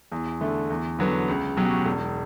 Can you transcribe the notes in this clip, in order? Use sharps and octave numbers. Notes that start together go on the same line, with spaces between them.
E2
D3 A3
E2
D3 F#3 B3
C#2
B2 F#3 C#4 G4
E1